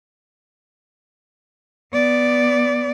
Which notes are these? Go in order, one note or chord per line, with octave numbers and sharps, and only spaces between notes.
B3 D5